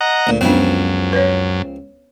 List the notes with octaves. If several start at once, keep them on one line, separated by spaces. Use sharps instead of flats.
D#5 F#5 A#5
D2 A#2
C#2 F#2 F3 B3 C4 D4
B4 C#5